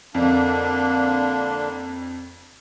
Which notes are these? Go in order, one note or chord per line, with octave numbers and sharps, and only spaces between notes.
F2 D3 A#3 D4